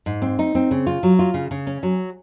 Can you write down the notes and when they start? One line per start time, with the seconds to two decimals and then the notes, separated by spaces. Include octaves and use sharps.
0.06 G#2
0.22 C4
0.39 D#4
0.55 C4
0.71 C#3
0.87 F4
1.03 F#3
1.19 F4
1.34 C#3
1.51 C#3
1.67 C#4
1.83 F#3